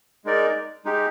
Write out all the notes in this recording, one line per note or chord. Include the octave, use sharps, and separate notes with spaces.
G#3 D#4 A#4 D5
G#3 D#4 G4